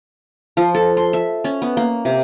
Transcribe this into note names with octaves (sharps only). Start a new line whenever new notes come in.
F3
A4
C6
E5
C#4
B3
A#3
C3